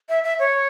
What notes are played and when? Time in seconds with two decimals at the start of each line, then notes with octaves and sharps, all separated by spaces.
0.09 E5
0.24 E5
0.39 C#5